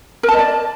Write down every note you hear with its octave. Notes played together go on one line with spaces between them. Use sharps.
A#4
A5
D#5
D5